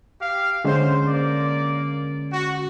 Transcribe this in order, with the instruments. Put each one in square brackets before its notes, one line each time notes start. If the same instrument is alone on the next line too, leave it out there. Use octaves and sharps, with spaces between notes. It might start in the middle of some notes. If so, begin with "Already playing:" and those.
[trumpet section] G4 F5
[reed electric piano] D3 G#3 C#4 [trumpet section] C5
[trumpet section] A#3 D5
F#4